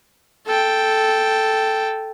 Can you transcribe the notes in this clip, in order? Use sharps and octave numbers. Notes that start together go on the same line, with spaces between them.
A4 G5